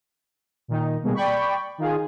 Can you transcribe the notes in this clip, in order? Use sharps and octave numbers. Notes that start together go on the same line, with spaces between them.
A#2 D#3 D#4
B2 G3 G#3 A#3
D5 G5 B5 C#6
D#3 F4 G#4